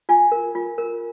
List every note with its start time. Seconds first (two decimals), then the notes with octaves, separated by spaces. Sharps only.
0.09 F4 G#5
0.32 A#4
0.55 F4
0.78 A#4